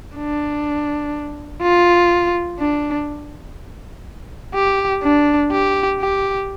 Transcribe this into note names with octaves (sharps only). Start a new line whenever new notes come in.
D4
F4
D4
G4
D4
G4
G4